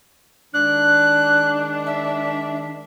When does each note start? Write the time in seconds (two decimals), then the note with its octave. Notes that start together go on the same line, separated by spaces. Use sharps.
0.54 D#3 G#3 D4 F#6
1.86 E5